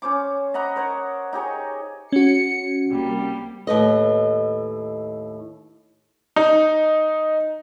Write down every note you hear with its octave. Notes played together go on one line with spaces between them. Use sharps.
C#4 C5 D6
D#5 F#5 A#5 B5
A#4 C5 C#5 F#5
D#4 G4 G#4 C#5
C#4 F#4 C#7
C2 G3 A#3
D#2 A2 B4 D#5
D#4